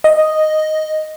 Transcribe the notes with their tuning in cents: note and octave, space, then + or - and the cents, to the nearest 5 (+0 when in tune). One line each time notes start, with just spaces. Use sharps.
D#5 +0